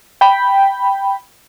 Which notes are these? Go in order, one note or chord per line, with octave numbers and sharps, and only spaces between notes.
G5 B5